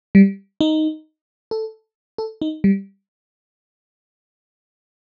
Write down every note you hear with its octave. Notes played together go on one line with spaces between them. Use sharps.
G3
D#4
A4
A4
D#4
G3